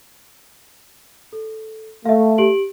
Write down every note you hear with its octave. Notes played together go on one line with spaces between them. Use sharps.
A4
A3 E5 F5
G4 D7 F#7